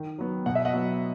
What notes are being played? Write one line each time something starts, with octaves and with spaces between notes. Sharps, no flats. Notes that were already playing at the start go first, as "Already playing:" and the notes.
Already playing: D#3
F#3 B3
B2 F#5
E5
D#5 F#5
F#3 B3